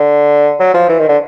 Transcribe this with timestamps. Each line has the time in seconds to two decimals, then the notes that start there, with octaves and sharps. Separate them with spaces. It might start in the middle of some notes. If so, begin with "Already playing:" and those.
Already playing: D3
0.60 F#3
0.74 F3
0.89 E3
0.99 D#3
1.09 D3